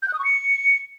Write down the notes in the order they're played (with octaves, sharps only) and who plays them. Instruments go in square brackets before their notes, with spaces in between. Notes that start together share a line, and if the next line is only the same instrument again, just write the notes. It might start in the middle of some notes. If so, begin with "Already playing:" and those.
[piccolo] G6
F#6
D#6
C#6
C#7